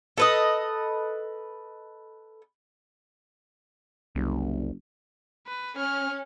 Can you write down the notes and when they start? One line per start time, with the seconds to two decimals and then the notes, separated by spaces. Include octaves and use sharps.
0.17 A4 B4 D#5
4.15 F#1 C2
5.47 B4
5.77 C#4 F6